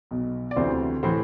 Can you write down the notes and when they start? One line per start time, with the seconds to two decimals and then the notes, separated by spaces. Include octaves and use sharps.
0.11 B1 B2
0.51 D5
0.56 D2 C3 E3 C5
1.03 A2 E3 C5